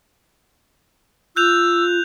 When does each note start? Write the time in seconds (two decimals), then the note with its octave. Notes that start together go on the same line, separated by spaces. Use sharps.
1.36 F4 E6 F#6 G6 F7